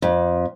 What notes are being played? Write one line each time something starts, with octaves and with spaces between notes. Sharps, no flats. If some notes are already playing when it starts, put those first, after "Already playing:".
F2